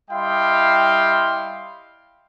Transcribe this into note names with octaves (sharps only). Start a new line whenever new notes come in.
G3 E4 D#5 F5 G5 C6